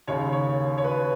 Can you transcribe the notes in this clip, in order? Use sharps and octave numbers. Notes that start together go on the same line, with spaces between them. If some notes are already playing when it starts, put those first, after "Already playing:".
D#2 C#3 C#5
C#5
C#5
B4